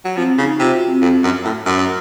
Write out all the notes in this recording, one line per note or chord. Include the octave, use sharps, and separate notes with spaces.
F#3
F3 C4
C#3 D#4
C3 F4
F#4
C4
F2
F#2
A2
F#2